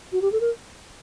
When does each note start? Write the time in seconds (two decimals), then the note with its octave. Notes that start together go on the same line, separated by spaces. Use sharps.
0.12 F#4
0.22 G4
0.32 A4
0.41 A#4